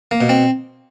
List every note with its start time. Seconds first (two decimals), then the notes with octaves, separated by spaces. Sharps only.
0.11 A#3
0.21 B2
0.29 C4